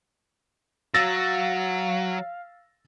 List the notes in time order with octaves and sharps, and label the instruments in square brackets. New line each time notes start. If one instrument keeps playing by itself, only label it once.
[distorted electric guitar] F#3 [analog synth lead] F5 [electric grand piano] E6 A6 A#6